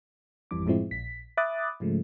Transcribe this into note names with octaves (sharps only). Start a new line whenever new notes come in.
G#1 F2 E3 G3 D6
F#2 A2 F3 G#3 C4 E4
A#1 B6
E5 B5 D6 D#6 F#6 A6
G#2 C#3 F3 G#3 A3